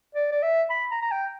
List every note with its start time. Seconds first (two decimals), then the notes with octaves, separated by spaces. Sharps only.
0.15 D5
0.32 D5
0.43 E5
0.70 B5
0.91 A#5
1.02 A#5
1.12 G5